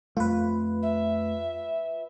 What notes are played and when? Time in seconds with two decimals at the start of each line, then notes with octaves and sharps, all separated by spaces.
0.17 F2 A3 F4 B4
0.82 E5